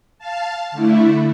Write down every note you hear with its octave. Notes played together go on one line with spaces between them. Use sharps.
F5 A5
D3 A3 E4